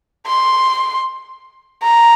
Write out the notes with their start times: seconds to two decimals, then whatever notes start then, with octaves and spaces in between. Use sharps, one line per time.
0.27 C6
1.83 A#5